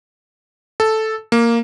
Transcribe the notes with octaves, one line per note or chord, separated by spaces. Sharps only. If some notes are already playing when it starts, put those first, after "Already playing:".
A4
A#3